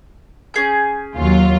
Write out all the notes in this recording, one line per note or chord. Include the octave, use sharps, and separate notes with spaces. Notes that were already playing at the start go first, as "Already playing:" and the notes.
C#4 G#4 G6
D#2 F#3 F4